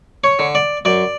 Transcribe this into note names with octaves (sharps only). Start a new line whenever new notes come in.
C#5
D3
D5
F#2 D5